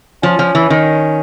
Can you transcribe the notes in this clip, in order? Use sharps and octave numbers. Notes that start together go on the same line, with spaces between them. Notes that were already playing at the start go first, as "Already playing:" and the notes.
F3 C#4
F3
E3
D#3